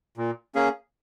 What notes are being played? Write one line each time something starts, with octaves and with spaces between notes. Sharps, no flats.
A#2
A#3 C#4 G#4